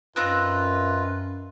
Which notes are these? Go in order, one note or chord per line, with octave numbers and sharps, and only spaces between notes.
F#2 C4 D#4 F4 B4 F#6